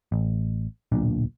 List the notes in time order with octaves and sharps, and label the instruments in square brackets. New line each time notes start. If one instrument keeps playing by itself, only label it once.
[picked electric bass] A1
D1 B1 A#2 D4